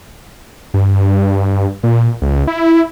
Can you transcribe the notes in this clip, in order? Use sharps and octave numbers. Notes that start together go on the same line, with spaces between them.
G2
A#2
C#2
E4